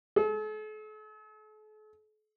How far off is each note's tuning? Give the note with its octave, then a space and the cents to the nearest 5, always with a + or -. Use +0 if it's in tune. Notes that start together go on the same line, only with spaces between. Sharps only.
A4 -45